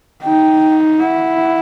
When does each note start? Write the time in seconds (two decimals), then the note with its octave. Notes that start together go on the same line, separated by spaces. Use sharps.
0.23 D#4 G5
1.00 E4 F#5